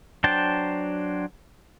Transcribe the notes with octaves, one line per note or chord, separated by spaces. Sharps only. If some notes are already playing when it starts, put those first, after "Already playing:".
F#3 D4 C5 G5 A5